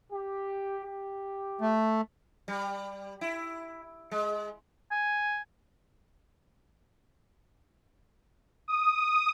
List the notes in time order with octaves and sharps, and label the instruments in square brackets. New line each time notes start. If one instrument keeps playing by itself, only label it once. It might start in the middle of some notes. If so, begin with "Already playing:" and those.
[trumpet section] G4
G4
[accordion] A3
[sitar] G3
E4
G#3
[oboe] G#5
[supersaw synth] D#6